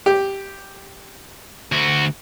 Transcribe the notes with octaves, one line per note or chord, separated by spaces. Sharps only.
G4
D2 F#4